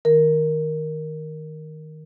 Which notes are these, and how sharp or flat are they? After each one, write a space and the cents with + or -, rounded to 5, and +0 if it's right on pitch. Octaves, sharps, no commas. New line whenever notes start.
D#3 +0 A#4 +0